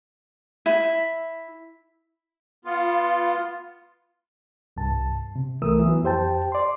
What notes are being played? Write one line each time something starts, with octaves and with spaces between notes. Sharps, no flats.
E4
B3 F4
C2 G2 A5
C3
C2 E3 A3 A#4 D#6 E6
E3 F#3 B3
F2 G4 C5 G5 A5
D5 C6